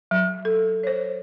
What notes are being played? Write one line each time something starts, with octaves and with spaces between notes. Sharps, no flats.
F#3
A4
C5 C#5